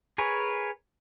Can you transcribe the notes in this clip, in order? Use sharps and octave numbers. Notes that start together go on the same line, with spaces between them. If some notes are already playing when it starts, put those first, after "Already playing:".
G#4 A#4 B4 C#5 G#5